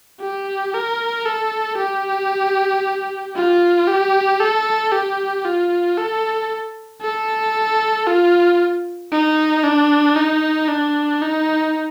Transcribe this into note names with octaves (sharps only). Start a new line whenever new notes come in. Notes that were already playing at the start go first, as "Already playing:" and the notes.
G4
A#4
A4
G4
F4
G4
A4
G4
F4
A4
A4
F4
D#4
D4
D#4
D4
D#4